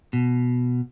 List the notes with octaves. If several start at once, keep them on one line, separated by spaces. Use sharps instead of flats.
B2